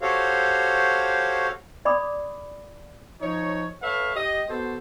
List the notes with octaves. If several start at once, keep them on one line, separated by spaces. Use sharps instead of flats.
F#4 G4 A4 C5 C#5 F5
D5 B5 D6 D#6
F3 D#4 C#5
A4 B4 C#5 E5 F5
G4 D#5
B3 F#4 A4 C5